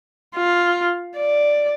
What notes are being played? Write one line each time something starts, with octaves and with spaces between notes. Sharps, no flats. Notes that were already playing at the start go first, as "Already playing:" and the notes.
F4
D5